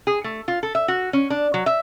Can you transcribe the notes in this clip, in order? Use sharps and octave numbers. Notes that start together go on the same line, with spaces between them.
G#4
A3
F4
A4
E5
F#4
C#4
D4
F#3
E5